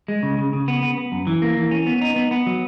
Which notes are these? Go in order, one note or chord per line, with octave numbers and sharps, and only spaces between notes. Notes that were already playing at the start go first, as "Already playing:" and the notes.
G#3
C#3
C#3
C#3
B3
B3
B3
F#2
E3
A#3
E3
C#4
B3
D#4
B3
B3
F#3